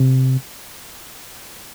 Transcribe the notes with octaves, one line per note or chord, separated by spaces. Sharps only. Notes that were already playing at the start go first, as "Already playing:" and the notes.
Already playing: C3